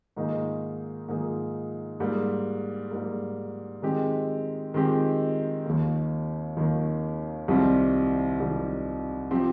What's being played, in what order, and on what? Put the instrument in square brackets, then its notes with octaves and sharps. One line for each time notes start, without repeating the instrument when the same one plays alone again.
[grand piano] G#2 D#3 A#3 D#4 G#4
G#2 D#3 A#3 D#4 G#4
G#2 G3 A#3
G#2 G3 A#3
D#3 G#3 C4 G4
D#3 G#3 C4 G4
D#2 D#3 A#3
D#2 D#3 A#3
C2 C3 D#3 G3 C4
C2 C3 D#3 G3 C4
F3 C4 G4